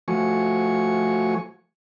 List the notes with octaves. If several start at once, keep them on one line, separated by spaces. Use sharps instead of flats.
F3 A3 F#4 G#5 C#6